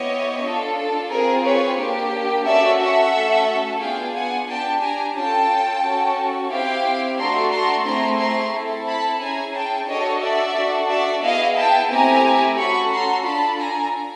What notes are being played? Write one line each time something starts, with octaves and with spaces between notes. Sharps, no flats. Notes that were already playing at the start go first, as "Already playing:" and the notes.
Already playing: B3 E4 G4 C#5 D#5
D4 F4 A4
A4
C4 F4 G#4 A#4
B4 C#5
A#3 D4 G4
C#4 F#4 A4 D5 E5
E5 F#5
A3 C#4 F#4 A4
B3 D4 F4 G#4 F5 G5
F#5 G#5
D4 G4 G5 A5
G#5 A#5
C#4 F4 A4 G5 A5
C#4 F#4 A4
C4 E4 G4 F5 G5
A3 D4 F#4 A4 A#5 C6
A#5 C6
A3 C4 E4 G#4 A#5 C6
A#5 C6
C4 E4 A4
A5 B5
C#4 E4 G#4 G#5 A#5
G5 A5
D4 F#4 A4 C#5 D#5
D5 E5
D4 F#4 A4
D5 E5
B3 E4 G#4 D#5 F5
G5 A5
A3 C4 E4 G4 G#5 A#5
C#4 F#4 A4 B5 C#6
A#5 C6
D4 F4 A4 A5 B5
G#5 A#5